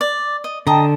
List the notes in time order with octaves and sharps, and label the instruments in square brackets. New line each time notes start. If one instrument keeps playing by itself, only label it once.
[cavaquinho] D5
D#5
[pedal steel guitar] D3 [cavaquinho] D#5 A#5 [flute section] G5 A5